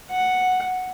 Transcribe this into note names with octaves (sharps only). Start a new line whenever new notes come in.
F#5